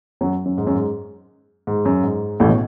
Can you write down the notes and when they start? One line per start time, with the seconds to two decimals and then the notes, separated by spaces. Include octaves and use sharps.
0.21 F#2 F#3
0.45 F#2
0.58 G#2
0.67 F#2
0.76 G#2
1.67 G#2
1.85 F#2
2.04 G#2
2.40 A1 A2
2.49 B2